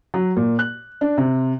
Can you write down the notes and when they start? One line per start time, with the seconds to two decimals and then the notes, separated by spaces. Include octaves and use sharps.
0.14 F#3
0.37 A#2
0.59 F#6
1.01 D4
1.18 C3